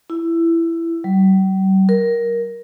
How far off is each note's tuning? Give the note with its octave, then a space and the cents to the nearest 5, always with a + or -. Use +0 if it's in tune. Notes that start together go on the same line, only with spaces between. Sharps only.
E4 +15
G3 -45
A#4 +10